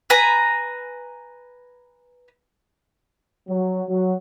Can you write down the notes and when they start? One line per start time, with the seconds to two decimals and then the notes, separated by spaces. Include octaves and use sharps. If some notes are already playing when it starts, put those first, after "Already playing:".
0.10 B4 G#5 A#5
3.48 F#3
3.89 F#3